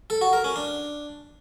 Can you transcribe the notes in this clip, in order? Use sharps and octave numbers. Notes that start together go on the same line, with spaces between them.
A4
F#4
A#4
C#4
D4